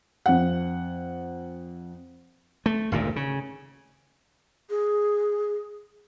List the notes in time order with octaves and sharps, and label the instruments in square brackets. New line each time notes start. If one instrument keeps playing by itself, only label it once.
[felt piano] F2 F#5
[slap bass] A3
G#1 D2 A#2 D#3
C#3
[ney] G#4